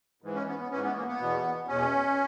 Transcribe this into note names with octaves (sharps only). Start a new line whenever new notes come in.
G#2 E3
C#4
B3
B3
G#2 E3 C#4
B3
A#3
B3
E2 B2
E2 B2 C#4